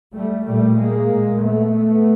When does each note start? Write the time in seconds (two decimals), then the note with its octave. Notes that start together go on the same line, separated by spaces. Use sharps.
0.15 G3 A3
0.46 A#2 G3 A3
0.77 G#3 A#3
1.08 A#2
1.40 A3 B3